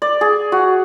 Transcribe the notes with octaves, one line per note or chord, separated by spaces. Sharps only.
D5
G#4
F#4